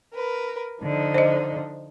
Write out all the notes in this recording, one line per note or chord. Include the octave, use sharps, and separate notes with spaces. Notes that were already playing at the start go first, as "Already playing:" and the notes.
A#4 B4
D3 F3 D#4
C5 D#5